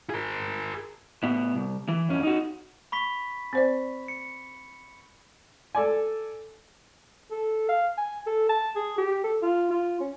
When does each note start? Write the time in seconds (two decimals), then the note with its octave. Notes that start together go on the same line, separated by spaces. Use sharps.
0.10 G#4 A#4
1.23 A2 B3
1.55 C2
1.88 E3
2.09 F2 C#4
2.23 D#4 F#4
2.92 B5 C#6 B6
3.53 C4 C5 D5
4.08 C#7
5.75 A4 D5 G#5
7.31 A4
7.69 F5
7.98 G#5
8.26 A4
8.49 A5
8.76 G#4
8.98 G4
9.24 A4
9.42 F4
9.70 F4
10.00 C#4